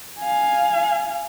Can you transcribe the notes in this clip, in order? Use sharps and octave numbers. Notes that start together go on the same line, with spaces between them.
F5 G#5